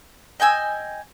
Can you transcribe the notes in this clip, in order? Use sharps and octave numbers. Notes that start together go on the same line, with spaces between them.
D#5 G5 G#5 E6